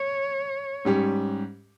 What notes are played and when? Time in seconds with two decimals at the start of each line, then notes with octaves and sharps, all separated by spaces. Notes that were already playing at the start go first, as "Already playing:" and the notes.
Already playing: C#5
0.85 G#2 G3 C#4 G4